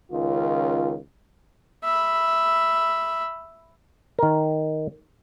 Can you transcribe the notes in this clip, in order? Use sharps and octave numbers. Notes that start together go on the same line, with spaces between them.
C#2 D#3 C#4 F4
E5 B5
D#3 A#4